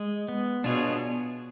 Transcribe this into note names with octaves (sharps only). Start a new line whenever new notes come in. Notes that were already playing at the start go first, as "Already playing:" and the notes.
Already playing: G#3
B3
B2 D4 F4 G#4 C#5